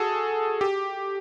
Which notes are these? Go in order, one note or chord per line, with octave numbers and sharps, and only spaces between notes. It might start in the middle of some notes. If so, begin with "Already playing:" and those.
Already playing: F#4 G#4 A4
G4